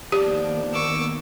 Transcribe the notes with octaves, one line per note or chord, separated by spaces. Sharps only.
D#3 F3 A#3 B3 D4 G4
C#6 D6 E6